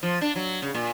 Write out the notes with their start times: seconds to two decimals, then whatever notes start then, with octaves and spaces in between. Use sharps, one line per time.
0.03 F3
0.21 D4
0.36 F#3
0.62 C#3
0.74 A#2